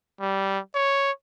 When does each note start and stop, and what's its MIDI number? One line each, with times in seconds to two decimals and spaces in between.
0.20 0.59 55
0.74 1.11 73